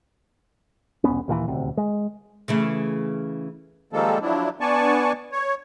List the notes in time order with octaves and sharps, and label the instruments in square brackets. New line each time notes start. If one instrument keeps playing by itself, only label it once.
[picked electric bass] E1 C2 B3 C#4
D#2 A#2 D#3 E3
D#1 D2 C3
G#3
[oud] C#3 E3 A3
[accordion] D#3 F3 G3 G#3 A#3 A4
F3 F#3 D4 E4
B3 D4 D5 G#5 A5 C#6
C#5